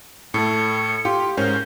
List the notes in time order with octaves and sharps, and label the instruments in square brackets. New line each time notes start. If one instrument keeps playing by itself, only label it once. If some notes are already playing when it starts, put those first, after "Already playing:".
[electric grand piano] A2 A3 [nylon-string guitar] A4 [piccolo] C#7
[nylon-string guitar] F4 [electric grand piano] G4
[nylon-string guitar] G#2 [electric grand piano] C#4 A#4 C5 [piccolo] G6